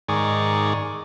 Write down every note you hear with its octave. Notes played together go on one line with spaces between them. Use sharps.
G#2 D#3 G#4 D5 C#6